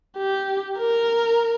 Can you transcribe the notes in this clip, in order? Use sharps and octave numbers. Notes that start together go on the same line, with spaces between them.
G4
A#4